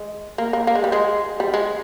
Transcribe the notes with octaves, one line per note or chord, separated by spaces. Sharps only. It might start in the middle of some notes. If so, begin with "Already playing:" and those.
Already playing: G#3
A#3
A#3
A#3
G#3
G3
G#3
G3
G#3